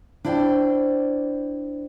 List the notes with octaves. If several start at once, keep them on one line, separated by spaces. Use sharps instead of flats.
D4 E4 C5 D5 E5 G5